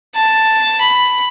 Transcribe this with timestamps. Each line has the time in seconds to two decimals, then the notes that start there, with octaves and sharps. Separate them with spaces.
0.16 A5
0.82 B5